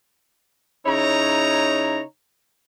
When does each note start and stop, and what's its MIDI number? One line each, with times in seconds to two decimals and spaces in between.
0.86 2.01 49
0.86 2.01 63
0.86 2.01 64
0.86 2.01 73
0.86 2.01 82